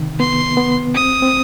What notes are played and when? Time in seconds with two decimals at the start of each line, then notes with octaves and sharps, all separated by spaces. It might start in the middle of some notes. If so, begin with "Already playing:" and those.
Already playing: C3 D#3
0.20 B3 C6
0.57 B3
0.95 C4 D#6
1.22 C4